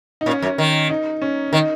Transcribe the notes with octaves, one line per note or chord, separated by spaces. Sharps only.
D#4
A#2 C#4
F#2
D#3
D#4
C#4
D#3 D#4